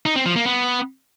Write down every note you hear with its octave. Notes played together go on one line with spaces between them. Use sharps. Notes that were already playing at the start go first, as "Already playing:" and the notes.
D#4
C4
F3
A#3
B3